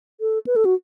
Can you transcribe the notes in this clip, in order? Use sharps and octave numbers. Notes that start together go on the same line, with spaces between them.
A4
B4
A4
F#4